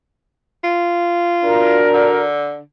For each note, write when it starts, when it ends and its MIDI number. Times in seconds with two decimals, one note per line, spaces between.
0.64 1.79 65
1.44 2.26 62
1.44 2.26 66
1.44 2.26 70
1.94 2.60 50